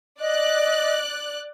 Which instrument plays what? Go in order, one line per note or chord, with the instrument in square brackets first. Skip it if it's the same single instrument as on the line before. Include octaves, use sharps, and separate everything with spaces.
[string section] D5 F#6 [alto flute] D#5